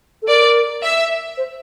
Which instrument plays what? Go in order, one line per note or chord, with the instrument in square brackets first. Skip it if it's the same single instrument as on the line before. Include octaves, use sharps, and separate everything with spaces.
[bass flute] A4
[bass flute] A#4 [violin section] D5
[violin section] E5
[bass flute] C5